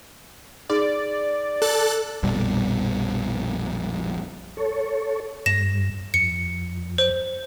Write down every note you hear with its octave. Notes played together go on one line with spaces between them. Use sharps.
D#4 G#4 D5
A4 F#6 A6
A#1 F2 B2 G3
A4 C#5
G2 A#6 E7
F2 C#7
C5